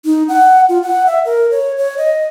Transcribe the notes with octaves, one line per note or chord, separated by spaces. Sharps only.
D#4
F#5
F4
F#5
E5
A#4
C#5
C#5
D#5